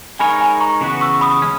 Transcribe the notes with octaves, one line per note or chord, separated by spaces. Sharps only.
G#3 D#4 A#4 C#5 G#5 B5
G#5 B5
A#5 C#6
C#3 E3 B3 F#4 B4
C#6 E6
B5 D#6
G#3 C#4